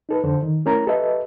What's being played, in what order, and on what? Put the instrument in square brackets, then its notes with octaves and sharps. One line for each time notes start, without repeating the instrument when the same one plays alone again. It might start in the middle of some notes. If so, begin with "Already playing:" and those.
[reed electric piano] D#4 A4 B4
F2 D3 A4 C5
D#3
A3 C#4 E4 A#4 A#5
G4 A4 B4 D#5 E5